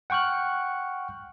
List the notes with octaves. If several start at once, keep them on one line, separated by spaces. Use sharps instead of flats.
F#5 G5 C#6 F6 F#6